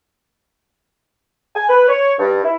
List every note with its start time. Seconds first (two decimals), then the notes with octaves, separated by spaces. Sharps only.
1.55 G#5
1.69 B4
1.88 C#5
2.19 G2
2.43 E4